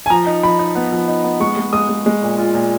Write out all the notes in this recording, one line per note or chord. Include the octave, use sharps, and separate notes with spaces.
G#5
F3 A#5
D#4
F3 B5
D#4
B3
F3
D#4
B3
G#3 C#6
G#3
G#3 D#6
G#3
G#3
A#2
F4
A#2